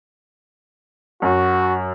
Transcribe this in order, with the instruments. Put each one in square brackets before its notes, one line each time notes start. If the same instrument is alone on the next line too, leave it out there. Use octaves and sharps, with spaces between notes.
[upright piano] F#2 [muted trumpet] F#4